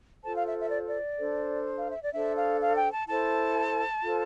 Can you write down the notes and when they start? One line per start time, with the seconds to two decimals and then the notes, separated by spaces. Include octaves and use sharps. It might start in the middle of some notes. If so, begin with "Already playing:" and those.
0.23 F4 A4 C5 A5
0.35 F5
0.47 E5
0.59 E5
0.69 D5
0.88 D5
1.18 D4 A4 C5
1.78 F5
1.90 E5
2.02 D5
2.13 D4 A4 C5 E5
2.37 F5
2.61 F5
2.76 G5
2.92 A5
3.08 E4 A4 C5 A5
4.03 F4 A4 C5